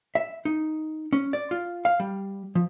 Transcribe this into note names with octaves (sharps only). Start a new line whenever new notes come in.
E5
D#4
C#4
D5
F4
F5
G3
F3